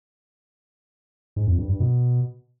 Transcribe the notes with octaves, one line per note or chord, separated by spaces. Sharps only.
G#2
F2
G2
G2
B2